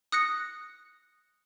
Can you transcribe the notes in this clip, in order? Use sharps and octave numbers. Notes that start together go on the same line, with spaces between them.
D#6 F#6 A#6 C#7